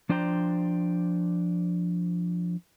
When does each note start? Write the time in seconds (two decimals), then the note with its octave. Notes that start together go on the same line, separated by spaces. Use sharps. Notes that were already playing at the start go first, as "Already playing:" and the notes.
0.09 F3 D4 C5 D5 G5 A#5